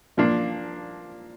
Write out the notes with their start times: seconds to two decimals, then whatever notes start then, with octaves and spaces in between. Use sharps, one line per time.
0.17 A#2 F3 A#3 D4